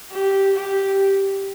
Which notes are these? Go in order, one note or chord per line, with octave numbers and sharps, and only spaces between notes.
G4
G4